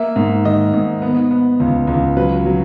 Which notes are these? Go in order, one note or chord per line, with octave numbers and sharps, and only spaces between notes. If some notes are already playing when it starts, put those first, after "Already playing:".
Already playing: A#3 E5
G#2
D#3 D#5
G#2
B3
B3
C#2
C#2
F#3 B4
F#3